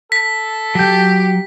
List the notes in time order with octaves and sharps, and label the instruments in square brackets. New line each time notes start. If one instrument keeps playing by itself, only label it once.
[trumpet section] A4 [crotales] B6
[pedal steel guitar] F#3 G6 [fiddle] G4